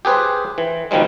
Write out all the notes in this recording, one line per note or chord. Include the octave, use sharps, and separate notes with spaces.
G4 G#4 B4 C5
E3
B2 D#3 F3 G3 G#3